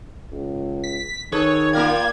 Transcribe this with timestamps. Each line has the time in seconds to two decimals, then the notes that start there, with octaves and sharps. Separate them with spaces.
0.32 C#2
0.84 B6
1.32 D#3 G#4 A4 B4 C#5
1.73 A#3 F4 A#4 D5 F5 G5 G#6